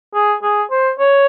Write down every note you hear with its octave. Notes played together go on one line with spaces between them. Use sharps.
G#4
G#4
C5
C#5